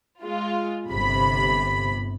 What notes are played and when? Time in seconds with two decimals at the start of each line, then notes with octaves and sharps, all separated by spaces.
0.23 G#3 F4
0.89 G1 C3 B5